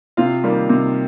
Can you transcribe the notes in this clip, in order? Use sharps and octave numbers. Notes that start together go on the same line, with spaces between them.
C3 F4 F5
D#3 G3 A#3
C3